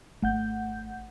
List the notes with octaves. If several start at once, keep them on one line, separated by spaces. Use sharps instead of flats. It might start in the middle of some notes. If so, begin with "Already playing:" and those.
G#1 A3 F#5 G6